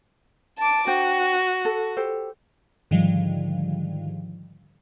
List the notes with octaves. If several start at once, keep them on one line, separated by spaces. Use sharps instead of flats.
A5 D6
D4 F#4 C5 G5
A4
G4 A4 C5
G#2 D3 D#3 F3 G3